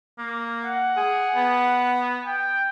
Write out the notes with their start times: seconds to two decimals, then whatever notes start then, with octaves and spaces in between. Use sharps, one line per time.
0.19 A#3
0.64 F#5
0.97 G#4
1.35 B3
2.24 G5